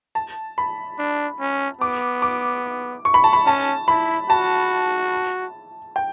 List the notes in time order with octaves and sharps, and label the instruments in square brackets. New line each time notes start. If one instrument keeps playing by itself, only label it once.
[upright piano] A5
B5
[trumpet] D4
C#4
[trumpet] B3 [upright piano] D6
[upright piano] D6
C#6
B5
A5
B5
[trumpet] C#4 [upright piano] A5
[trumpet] E4 [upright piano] B5
[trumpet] F#4 [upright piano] A5
[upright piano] G5